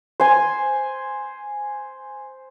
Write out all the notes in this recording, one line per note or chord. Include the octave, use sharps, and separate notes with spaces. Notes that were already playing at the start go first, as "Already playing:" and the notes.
C5 G#5